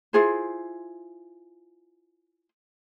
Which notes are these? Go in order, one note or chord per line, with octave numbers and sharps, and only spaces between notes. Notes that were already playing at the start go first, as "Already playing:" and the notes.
E4 F4 G#4 C5